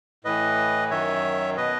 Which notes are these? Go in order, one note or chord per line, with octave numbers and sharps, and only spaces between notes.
A2 E3 B4 D#5
F#2 D#3 C#5 E5
B2 B4 D#5